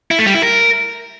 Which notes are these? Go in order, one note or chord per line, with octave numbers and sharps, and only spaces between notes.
E4
A3
G3
E4
A#4